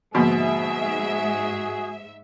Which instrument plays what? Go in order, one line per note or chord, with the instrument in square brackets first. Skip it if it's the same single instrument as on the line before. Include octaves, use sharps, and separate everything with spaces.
[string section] G#2 E5 [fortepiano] B2 [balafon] D3 F3 A#3 [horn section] F#4 G#4